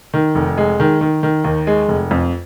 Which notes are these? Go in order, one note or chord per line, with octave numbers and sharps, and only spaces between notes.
D#3
F1
G#3
D#3
D#3
D#3
D#2
G#3
F1
F2